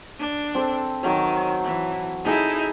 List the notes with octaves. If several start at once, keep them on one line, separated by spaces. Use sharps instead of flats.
D4
C4 A4
D#3 F#3 C#5
E3
D#4 E4 G#4 A4 G#5